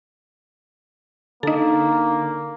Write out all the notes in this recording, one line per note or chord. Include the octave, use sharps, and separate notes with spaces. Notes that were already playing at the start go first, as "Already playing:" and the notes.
D3 A#3 D#4 A4